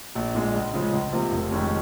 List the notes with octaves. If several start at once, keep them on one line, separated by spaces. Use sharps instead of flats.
A#1
A#2 G#3
C#2
C#3 F3 G#3
C#2
C3 F3 A#3
F1
F2 D#3 G#3 C#4